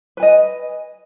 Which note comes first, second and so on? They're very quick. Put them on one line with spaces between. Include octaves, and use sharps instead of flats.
B4 G#5 D#5